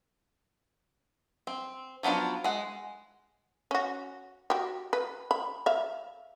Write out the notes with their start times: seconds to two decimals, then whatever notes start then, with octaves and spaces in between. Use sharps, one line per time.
1.47 C4
2.03 F3 F#3 B3 D4 F4
2.44 G#3 F#5
3.71 C#4 F#4
4.50 F#4 G4
4.93 B4
5.31 B5
5.66 E5 F5